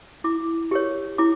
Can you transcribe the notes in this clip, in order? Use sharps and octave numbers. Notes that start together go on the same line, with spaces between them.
E4 D6
G4 A#4 C#5
E4 D6